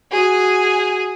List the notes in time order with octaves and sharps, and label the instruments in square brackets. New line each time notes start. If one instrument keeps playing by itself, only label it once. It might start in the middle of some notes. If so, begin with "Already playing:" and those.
[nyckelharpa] F#4 [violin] G#4